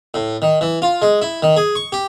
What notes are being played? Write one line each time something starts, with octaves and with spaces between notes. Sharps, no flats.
A2
D#3
E3
F4
G#3
E4
D#3
G#4
C#6
G4